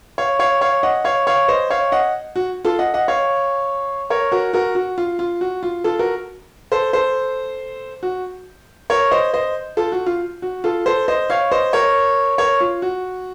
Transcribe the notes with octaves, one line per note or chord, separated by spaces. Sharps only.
C#5 F5
C#5 F5
C#5 F5
D#5 F#5
C#5 F5
C#5 F5
C5 D#5
C#5 F5
D#5 F#5
F#4
F4 A4
D#5 F#5
D#5 F#5
C#5 F5
A#4 C#5
F#4 A#4
F#4 A#4
F#4
F4
F4
F#4
F4
F4 A4
F#4 A#4
A4 C5
A4 C5
F#4
A#4 C#5
C5 D#5
C5 D#5
F4 A4
F#4
F4
F#4
F4 A4
A4 C5
C5 D#5
C#5 F5
C5 D#5
A#4 C#5
A#4 C#5
F4
F#4